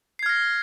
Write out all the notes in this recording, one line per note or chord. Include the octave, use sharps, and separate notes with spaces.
F6 G#6 A#6 C7